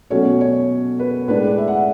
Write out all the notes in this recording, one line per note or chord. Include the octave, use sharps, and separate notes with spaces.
B2 F#3 A3 C#4 C#5
C#5
B4
A2 G#3 D4 B4
D5
E5
F#5
E5